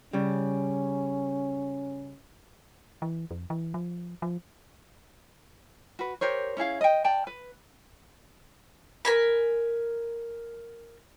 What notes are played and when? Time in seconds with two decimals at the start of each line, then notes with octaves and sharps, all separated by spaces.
0.13 C#3 G3 C#4
3.02 E3
3.31 F2
3.50 E3
3.74 F3
4.22 F3
5.99 F#4 B4
6.21 G4 A#4 C5 C#5
6.57 C#4 E4 G#4 F5
6.81 D#5 G5
7.04 D5 G5 A5
7.27 B4
9.05 A#4 G#5 B5